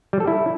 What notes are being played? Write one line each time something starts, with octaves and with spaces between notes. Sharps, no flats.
G3
A4
E4